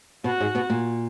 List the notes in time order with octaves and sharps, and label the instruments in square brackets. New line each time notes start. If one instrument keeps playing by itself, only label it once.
[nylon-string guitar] B2 B3 [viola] F#4
[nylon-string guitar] G#2 G#3
B2 B3
A#2 A#3